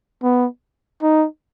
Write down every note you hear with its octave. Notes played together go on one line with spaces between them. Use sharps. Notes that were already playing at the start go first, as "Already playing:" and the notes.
B3
D#4